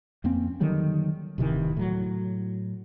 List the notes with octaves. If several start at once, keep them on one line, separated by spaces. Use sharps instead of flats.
F2 A#3 C4 C#4
D3 D#3 F#3 G3
D1 C3 D#3 E3
A2 F#3